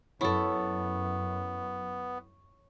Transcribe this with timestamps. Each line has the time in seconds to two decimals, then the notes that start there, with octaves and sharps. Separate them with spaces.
0.21 F#2 B3 E4 A4 C#5